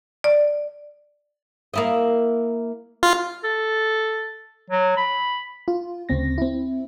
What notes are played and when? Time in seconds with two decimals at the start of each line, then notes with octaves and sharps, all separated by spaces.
0.24 D5
1.74 A#3 E4 D#5
3.03 F4
3.44 A4
4.71 F#3
4.97 B5
5.68 F4
6.09 D2 C#3 C4 A#6
6.38 C4 E4